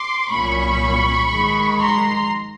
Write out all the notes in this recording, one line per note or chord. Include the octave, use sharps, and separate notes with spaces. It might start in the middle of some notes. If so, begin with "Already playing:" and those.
Already playing: C6 D6
C2 A#2 F#3 A#3 C#4 B5 C#6
G#2 D#3 G#3
A#5 C6